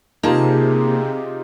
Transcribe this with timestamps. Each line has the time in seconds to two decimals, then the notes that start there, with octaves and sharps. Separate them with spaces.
0.23 C3 A#3 D#4 F4 G4 G#4 A5